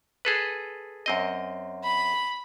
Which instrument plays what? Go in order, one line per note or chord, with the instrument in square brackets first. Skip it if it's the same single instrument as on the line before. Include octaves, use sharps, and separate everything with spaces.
[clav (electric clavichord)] G#4 A4 B4
F#2 C4 D#5
[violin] B5